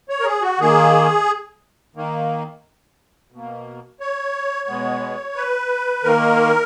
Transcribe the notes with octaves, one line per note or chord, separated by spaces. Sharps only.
C#5
A#4
G#4
F#4
D#3 A#3 G#4
D#3 A#3
B2 A#3
C#5
B2 G#3 B3
B4
D#3 A#3 A#4